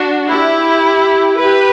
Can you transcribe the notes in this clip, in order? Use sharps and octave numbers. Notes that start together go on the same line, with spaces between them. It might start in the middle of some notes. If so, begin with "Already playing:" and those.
Already playing: D4 F#4
E4 G4
G4 B4